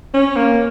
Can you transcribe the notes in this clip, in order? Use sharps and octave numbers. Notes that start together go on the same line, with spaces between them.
C#4
A#3